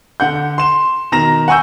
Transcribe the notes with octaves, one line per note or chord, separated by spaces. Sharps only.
D3 F#5 G6
C6 E7
B2 D#3 A#5 A#6 E7
F#5 G#5 C#6 E6 G6